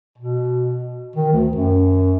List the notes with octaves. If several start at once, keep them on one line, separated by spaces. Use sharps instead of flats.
B2
D#3
D2
F#2